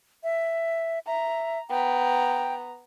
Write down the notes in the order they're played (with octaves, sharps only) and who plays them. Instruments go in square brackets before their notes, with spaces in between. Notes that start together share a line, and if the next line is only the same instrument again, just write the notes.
[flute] E5
[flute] E5 [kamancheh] A#5
[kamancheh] B3 A#5 [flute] G5